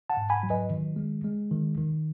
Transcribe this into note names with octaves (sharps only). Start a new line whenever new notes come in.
F#5 A5
G#2
G#5 B5
F#3
B4 D#5
D#3
G#3
G#3
D#3
D#3